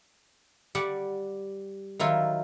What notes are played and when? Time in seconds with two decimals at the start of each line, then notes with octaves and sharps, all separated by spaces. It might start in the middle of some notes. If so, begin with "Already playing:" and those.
0.75 G3 D5 F#5
1.99 D#3 F#3 E4 F4